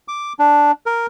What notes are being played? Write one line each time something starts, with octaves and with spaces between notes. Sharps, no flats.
D6
D4
A#4